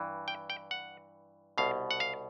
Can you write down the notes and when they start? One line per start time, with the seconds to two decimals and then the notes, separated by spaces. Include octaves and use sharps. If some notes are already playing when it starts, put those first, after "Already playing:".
Already playing: G2 E3
0.28 G5
0.50 G5
0.71 F#5
1.58 C2 B2 F5
1.91 F#5
2.00 F5